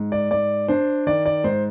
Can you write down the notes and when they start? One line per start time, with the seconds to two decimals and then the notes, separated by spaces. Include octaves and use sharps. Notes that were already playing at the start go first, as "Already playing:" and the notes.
Already playing: G#2
0.12 D5
0.31 G#2 D5
0.68 D4 C5
1.07 D#3 D5
1.26 D5
1.44 G#2 C5